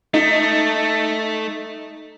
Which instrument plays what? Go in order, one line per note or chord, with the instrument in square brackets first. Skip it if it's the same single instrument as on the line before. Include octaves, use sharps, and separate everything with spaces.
[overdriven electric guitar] A3 [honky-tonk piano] D#4